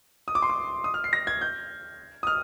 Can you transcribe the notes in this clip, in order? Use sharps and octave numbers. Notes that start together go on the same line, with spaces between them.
D#6
D6
C6
D6
D#6
F6
C7
A#6
G#6
G6
D#6
F6